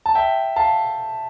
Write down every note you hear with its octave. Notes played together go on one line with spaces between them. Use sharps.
A5
E5 G5
F5 A5